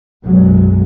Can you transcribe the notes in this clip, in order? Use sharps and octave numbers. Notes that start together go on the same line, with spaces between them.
B1 F#2 F#3 G#3